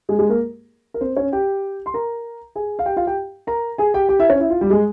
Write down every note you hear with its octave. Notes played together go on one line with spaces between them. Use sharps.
G#3 G#4
G#3 G#4
A#3 A#4
A#4
C4 C5
C#4 C#5
G4 G5
C6
A#4 A#5
G#4 G#5
F5
G4 G5
F4 F5
G4 G5
A#4 A#5
G#4 G#5
G4 G5
G4 G5
E4 E5
C#4 C#5
E4
F4
G3 G4
G#3 G#4